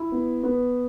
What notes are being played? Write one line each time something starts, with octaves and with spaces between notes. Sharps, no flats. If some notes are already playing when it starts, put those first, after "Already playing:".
Already playing: E4
B3
B3